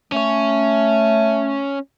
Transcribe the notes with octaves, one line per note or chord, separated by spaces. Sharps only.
A3 C#4 C#5